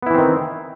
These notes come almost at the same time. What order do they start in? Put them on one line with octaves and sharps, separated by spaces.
B3 E4 E3 C4 D#3